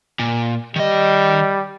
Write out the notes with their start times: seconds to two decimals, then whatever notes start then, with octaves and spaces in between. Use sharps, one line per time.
0.19 A#2
0.76 D#3 G3 D#5